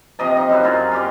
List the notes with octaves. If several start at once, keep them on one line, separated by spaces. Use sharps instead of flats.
C3 F3 D#5 A#5
D#4
F#2 F#3 E4 F#4
F#2 F4 G#4
F4 G4 D#5